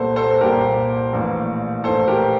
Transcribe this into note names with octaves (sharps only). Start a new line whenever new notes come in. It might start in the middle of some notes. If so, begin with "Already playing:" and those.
Already playing: C2 A#2 G3 A#3 A4 C5
A4 C5
A4
C2 A#2 G3 A#3 G4 A#4
A#1 A2 E3 A#3
A#1 A2 E3 A#3 A4 C5
G4 A#4